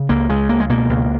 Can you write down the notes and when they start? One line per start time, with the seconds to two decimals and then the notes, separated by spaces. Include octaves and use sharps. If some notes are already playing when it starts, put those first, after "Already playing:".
Already playing: C#3
0.09 C#2 A#3
0.29 C#3 G#3
0.49 C#2 A#3
0.60 G#3
0.69 B2 A#3
0.89 C#2